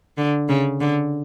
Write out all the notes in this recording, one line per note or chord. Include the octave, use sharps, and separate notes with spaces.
D3
C#3
D3